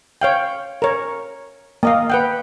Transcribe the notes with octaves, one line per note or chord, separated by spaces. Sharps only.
C#5 F5 G5
A#4 C#5
A#3 D#5 F5
B4 F#5 G5